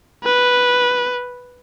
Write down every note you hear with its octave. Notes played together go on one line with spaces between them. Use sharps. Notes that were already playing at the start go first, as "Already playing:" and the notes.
B4